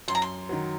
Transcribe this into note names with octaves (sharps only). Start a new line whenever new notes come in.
F#2 C6
A#5
C6
D#3 F#3